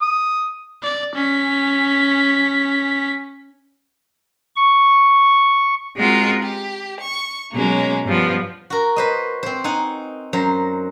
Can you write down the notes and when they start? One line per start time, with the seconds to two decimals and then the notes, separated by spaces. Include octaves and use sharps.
0.02 D#6
0.83 D5
1.15 C#4 B6
4.56 C#6
5.97 G#3 C4 F4 F#4 A#4
6.42 G4
6.99 C#6
7.53 B2 F#3 G#3 A#3 C#4
8.06 G2 F3 B3
8.70 F#4 A#4
8.96 B4 C5 D#5
9.43 C4 C5
9.64 D#4 F#5 G#5
10.33 F#2 C5 A#5